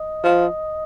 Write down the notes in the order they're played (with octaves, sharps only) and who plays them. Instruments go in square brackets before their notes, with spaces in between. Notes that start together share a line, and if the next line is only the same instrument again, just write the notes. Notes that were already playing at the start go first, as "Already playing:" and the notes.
Already playing: [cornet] D#5
[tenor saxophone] F3